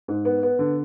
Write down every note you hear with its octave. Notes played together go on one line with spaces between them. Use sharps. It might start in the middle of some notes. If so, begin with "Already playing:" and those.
G#2
B3
B3
D3